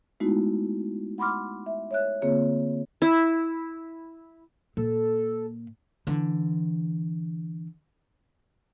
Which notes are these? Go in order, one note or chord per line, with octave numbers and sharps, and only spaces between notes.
G#3 A3 B3 D#4 E4 F#4
F#5 B5 C6 D6 F6
E5
C#5 E5 F#6
D3 A#3 C4 F4 G#4 C#5
E4
A#2 A4
D3 E3